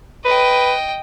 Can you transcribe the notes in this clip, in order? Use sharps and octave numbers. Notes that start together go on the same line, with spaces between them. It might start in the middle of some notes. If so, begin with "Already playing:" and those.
B4 D#5 G5